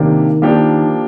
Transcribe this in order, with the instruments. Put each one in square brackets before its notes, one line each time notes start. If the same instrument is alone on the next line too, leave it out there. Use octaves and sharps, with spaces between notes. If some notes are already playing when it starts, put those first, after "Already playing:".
Already playing: [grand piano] C3 A#3 D4 G4 [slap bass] D#3
[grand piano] F3 A#3 D4 G4